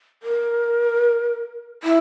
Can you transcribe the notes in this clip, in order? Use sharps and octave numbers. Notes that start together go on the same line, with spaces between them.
A#4
E4